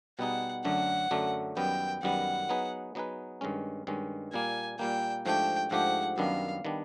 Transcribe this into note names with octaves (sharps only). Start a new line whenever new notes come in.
B2 G3 B3 D#4 G#4 F#5
F#2 D3 F#3 A3 D4 F#5
F#2 D3 F#3 A3 D4
F#2 D#3 G3 B3 G5
F#2 D#3 G3 B3 F#5
F#3 B3 D#4 G#4 B4
F#3 B3 D#4 G#4 B4
G2 D#3 G#3 C#4
G2 D#3 G#3 C#4
A#2 G3 A#3 G#5
A#2 G3 A#3 G5
G#2 F3 A3 D4 G4 G5
G#2 F3 A3 D4 G4 F#5
F#2 D#3 G3 B3 D4 F5
D#3 G3 B3 D4